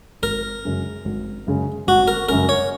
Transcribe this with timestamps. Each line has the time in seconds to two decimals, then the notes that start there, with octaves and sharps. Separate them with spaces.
0.22 G#1 A#4
0.65 F#2 C#3 G#3 C#4
1.05 G#1
1.47 F#2 C#3 G#3 C#4
1.87 G#1 F#4
2.08 A#4
2.29 F#2 C#3 G#3 C#4 A#4
2.49 C#5